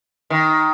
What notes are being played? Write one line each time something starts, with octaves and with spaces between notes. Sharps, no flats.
D#3